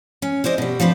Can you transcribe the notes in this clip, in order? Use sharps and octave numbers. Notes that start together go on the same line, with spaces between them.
C#4
E4 C5 D5 D#5
B2 G3
F3 C4 D4 B4